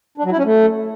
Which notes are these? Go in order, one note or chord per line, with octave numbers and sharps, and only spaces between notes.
D4
F#3
E4
C#4
A3